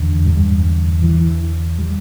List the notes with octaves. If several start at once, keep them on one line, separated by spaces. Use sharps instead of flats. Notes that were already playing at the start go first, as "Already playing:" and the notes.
Already playing: E2 D3
G2 G3
E3
G3